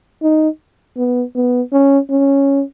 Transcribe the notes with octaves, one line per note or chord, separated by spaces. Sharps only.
D#4
B3
B3
C#4
C#4